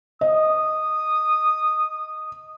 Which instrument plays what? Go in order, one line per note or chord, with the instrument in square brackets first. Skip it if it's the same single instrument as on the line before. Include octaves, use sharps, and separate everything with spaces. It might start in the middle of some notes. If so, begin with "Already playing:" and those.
[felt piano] D#5 [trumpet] D#6